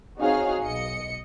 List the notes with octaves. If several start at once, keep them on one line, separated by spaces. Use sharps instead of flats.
C4 D#4 F#4 G#4 C#5 F5
B1 D#5 C#7